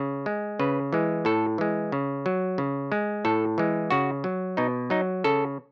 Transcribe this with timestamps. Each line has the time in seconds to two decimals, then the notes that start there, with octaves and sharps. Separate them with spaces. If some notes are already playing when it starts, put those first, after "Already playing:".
Already playing: C#3
0.26 G#3
0.59 C#3 B4
0.93 E3 G#3
1.25 A2 A4
1.58 E3 G#3
1.92 C#3
2.26 F#3
2.58 C#3
2.92 G#3
3.25 A2 A4
3.58 E3 G#3
3.90 C#3 F#4
4.24 F#3
4.57 B2 D#4
4.90 F#3 D#4
5.24 C#3 A4